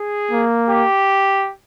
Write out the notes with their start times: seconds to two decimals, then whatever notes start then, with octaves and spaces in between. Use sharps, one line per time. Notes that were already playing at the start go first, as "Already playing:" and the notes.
Already playing: G#4
0.31 A#3
0.70 G4